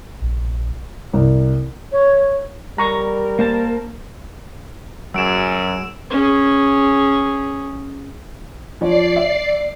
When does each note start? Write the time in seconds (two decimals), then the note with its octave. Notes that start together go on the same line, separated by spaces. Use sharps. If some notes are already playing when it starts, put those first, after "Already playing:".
0.22 A#1
1.13 C2
1.92 C#5
2.78 G3 A#4 A#5 C#6
3.39 A#3 C5 A5
5.14 F#2 F#3 G#4 E6 D7 E7
6.11 C#4 G#4
8.81 F3 C#5 D5 C7
9.16 E5